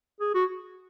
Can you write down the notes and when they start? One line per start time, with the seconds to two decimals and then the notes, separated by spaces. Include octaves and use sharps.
0.20 G#4
0.34 F#4